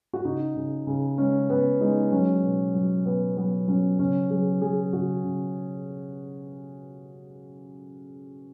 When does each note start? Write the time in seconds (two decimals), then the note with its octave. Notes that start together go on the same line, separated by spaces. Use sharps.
0.13 F#4
0.25 C#3 D#4
0.56 C#3
0.87 C#3
1.18 G#3 C#4
1.50 C#3 B3
1.81 G#3 D#4
2.12 F#3 C#4
2.43 B2
2.74 F#3
3.05 B2 B3
3.37 F#3 B3
3.68 F#3 C#4
3.99 C#3 C#4
4.30 F#3 G#4
4.61 F#3 G#4
4.93 C#3 F#4
5.24 C#3